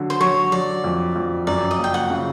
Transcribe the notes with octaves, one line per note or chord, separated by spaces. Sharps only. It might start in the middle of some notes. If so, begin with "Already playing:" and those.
Already playing: D3 F#3
C5
F#3 C#5
F#3 D5
F2
F2
F#2 D5
D#5
F#1
G5
F#5
C#3